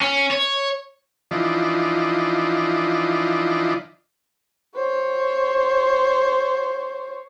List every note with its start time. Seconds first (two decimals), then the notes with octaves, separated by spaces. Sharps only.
0.01 C#4
0.31 C#5
1.31 E3 F3 D4 D#4
4.76 C5 C#5